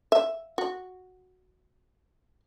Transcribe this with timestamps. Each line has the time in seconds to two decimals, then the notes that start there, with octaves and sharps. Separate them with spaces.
0.12 E5
0.58 F#4